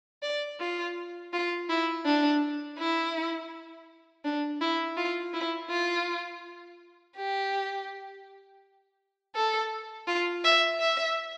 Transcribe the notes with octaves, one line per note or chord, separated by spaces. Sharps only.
D5
F4
F4
E4
D4
E4
D4
E4
F4
E4
F4
G4
A4
F4
E5
E5